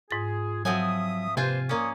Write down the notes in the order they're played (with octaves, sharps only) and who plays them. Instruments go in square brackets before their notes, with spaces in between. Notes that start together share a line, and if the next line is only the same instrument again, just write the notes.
[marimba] G#2 A6 [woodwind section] F4 G#4
[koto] F3 C4 G#5 [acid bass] F#3 [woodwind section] E5 D#6 [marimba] F#5
[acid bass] C3 [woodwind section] A#3 B4 C5 [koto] F4 G#5
[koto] A#3 C#4 [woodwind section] D5 C#6 D#6